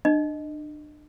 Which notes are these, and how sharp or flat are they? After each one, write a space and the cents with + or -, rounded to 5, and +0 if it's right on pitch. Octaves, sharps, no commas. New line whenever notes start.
D4 +35 D#5 +0